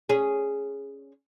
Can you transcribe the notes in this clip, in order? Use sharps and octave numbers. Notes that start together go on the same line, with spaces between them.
C#4 G#4